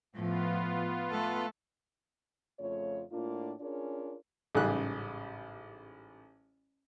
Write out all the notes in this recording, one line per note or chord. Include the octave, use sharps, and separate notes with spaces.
A2 F3 B3 F4
A3 A4
F2 C#3 A3 F4 C#5
A2 A#3 D4 F4
C#4 D4 F4 G#4 A#4 C#5
A1 G#2 C#3 G3 F#6